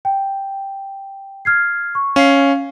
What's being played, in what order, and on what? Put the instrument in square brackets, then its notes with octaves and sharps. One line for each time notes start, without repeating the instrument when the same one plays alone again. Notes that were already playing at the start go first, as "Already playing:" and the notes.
[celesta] G5
F6 G#6 C7
C#6
[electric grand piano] C#4 [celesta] F5 C7